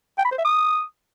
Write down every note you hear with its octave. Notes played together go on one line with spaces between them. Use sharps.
G5
B5
C5
E5
D#6